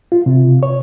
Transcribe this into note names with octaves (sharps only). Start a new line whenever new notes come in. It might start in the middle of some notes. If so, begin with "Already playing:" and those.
F4
C3
C#5